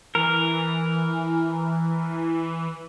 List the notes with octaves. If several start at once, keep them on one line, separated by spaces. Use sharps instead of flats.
E3 A#4